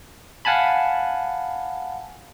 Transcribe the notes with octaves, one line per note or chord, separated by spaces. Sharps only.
F5 F#5 G#5 A5 B5